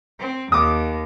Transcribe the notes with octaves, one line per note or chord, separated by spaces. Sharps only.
C4
D#2 D6 D#6